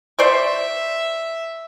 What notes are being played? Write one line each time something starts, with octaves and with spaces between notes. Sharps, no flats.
C5 D5 E5 C#6